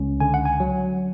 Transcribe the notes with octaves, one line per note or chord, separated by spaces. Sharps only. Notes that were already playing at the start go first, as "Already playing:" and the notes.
Already playing: C#2 C#4
D3 G#5
F#5
G#5
F#3